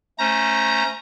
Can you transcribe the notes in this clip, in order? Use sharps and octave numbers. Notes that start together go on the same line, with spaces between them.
A3 C#4 C5 A#5